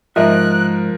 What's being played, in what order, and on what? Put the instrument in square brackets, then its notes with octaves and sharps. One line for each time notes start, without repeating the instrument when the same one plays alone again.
[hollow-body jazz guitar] G#2 D#5 E5 [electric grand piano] F3 A#4 [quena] F#6